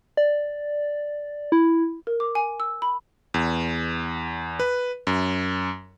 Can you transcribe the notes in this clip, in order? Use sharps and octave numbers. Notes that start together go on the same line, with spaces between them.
D5
E4
A#4
D6
G#5
E6
B5
E2
B4
F#2